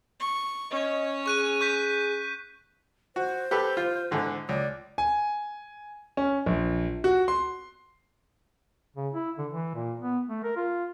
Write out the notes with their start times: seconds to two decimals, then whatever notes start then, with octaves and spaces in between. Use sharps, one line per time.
0.20 C#6
0.70 C#4 C#5 D#5
1.26 G#4 C#6 F#6 D#7
1.61 C#6 G6 B6
3.16 F#4 C5
3.51 G4 A4 B4
3.77 F4
4.11 G#2 D3 E3
4.49 C#2 D5
4.98 G#5
6.17 C#4
6.46 A#1
7.04 F#4
7.28 C6
8.96 C#3
9.13 E4
9.38 D3
9.51 E3
9.75 A#2
10.00 B3
10.29 A3
10.44 A#4
10.56 F4